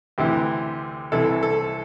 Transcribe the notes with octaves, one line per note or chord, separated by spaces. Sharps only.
D2 C3 E3 G4
C2 C3 E3 A4
A4